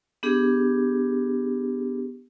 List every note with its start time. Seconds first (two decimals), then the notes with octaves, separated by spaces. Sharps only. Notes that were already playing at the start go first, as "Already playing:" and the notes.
0.23 B3 D4 G4 G#4